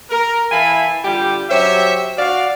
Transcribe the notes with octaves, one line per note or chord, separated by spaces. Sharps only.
A#4
E3 E4 F5 G#5 A5 B5
D3 G3 F4 G4 G5
F#3 G4 C5 C#5 E5
F#4 D5 F5